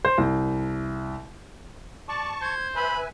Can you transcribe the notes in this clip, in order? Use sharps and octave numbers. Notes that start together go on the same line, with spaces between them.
C5
C2
D5 A5 C#6
C5 G#6
B4 E5 G#5 B5